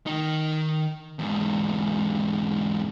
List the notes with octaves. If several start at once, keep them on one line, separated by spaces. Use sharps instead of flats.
D#3 D#4
E2 G#2